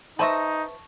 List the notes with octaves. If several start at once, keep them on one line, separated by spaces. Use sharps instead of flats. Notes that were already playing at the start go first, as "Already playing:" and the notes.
D#4 B4 C5 E5 A5 C#6 A#6